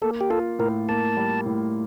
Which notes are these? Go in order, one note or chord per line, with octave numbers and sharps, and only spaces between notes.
A#3 A4
G4
F4 A4
A2 A#4
A#3 A5
G3
A2